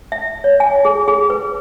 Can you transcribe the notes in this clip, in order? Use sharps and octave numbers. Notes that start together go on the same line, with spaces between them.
E5
C#5
G#5
G#4
G#4
B4